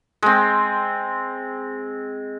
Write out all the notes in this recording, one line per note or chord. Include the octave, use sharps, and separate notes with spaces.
G#3 C4